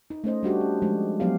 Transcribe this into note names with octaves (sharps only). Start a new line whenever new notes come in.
D#4
A3 C#4 C5 D#5
G3 D4 F#4 G4
C#4
F3 G#3
F3 F#3 B3 G4 F5